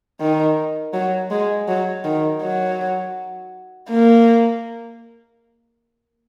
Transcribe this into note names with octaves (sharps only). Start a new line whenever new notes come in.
D#3
F#3
G#3
F#3
D#3
F#3
A#3